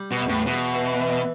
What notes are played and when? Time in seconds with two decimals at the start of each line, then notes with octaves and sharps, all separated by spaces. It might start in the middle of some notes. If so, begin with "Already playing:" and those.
Already playing: G3
0.11 B2
0.20 E2
0.29 A2
0.47 E2 B2
0.74 E3
1.00 E3